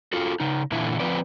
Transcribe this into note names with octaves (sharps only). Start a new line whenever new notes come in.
F4 F#4 A4
C#3 D#4
A#2 D3 E3 E4
F3 C4 B4 D5